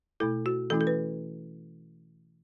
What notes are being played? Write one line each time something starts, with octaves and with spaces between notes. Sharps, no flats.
B2 A3 E4 A4
F#4
E3 A3 C#4 E4 A4
A4
B4